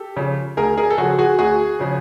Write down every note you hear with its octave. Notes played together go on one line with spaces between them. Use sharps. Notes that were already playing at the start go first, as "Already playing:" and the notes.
Already playing: G4 A4
C#3 F3
D2 G#4 A#4
G#4 A#4
A4
C#3 F3 F#4 G#4
F#4 G#4
D2 F#4 G#4
C#3 F3